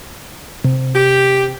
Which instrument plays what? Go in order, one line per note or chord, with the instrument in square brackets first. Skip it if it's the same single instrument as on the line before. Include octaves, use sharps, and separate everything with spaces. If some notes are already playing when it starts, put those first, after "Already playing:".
[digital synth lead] C3
[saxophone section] G4